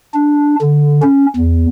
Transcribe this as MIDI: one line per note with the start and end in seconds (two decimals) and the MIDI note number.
0.14 0.55 62
0.61 1.00 50
1.02 1.26 61
1.36 1.66 40